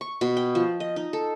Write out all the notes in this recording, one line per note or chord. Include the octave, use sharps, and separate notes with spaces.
C#6
B2
G5
F3
D#5
D#4
A4